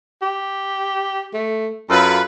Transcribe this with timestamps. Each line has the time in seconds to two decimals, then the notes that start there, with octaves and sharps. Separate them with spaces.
0.22 G4
1.34 A3
1.90 F#2 F4 A4 B4